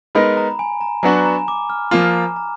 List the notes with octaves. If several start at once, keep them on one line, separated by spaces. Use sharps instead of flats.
G#3 B3 D#4 A#4 B5
A#5
G#5
A#5
F#3 B3 D4 F#4 G#5
A#5
D6
F6
F3 A#3 F4 A#5
A#5